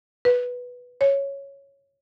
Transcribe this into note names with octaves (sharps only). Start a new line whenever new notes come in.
B4
C#5